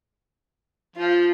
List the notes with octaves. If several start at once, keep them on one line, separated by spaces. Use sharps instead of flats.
F3 F4